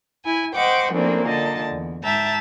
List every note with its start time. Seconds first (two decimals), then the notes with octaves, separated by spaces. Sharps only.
0.24 E4 G#5
0.55 C5 D#5 F#5 G5 C#6 D6
0.91 F#2 A2 F3 A#3 C4 D4
1.25 A#2 D3 D#5 A5
1.68 E2
2.03 G#2 E5 G5 A5 A#5